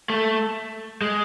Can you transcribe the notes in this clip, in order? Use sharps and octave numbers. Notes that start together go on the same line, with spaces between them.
A3
G#3